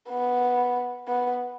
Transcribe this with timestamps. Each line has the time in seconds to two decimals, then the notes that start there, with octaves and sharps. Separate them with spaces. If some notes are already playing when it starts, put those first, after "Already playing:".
0.10 B3
1.08 B3